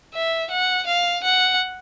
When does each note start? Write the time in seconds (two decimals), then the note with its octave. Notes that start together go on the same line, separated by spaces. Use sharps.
0.15 E5
0.51 F#5
0.87 F5
1.24 F#5